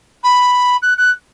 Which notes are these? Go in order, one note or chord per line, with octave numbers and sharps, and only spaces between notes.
B5
F#6
F#6